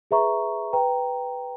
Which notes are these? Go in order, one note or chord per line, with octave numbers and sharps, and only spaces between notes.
G#4 B4 E5 A#5 C#6
B4 G5 A#5